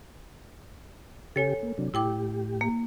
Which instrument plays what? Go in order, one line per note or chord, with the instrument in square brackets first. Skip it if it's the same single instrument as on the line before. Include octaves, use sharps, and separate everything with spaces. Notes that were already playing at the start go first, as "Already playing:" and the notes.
[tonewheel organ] C#3 G4 [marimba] A4 C#5 G#5
[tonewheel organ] A#3
C3 F#3 D4
[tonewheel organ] A2 G4 [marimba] E4 G5 D6
[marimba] A#3